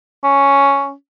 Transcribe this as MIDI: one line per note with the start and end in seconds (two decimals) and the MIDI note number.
0.24 0.92 61